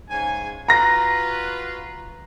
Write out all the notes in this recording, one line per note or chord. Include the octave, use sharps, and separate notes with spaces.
G#2 C#3 G#5
F4 F#4 B4 A#5 A#6